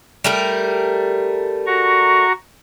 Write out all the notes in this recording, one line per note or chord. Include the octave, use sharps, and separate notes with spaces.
G3 A3 A#4
F#4 A#5 C#6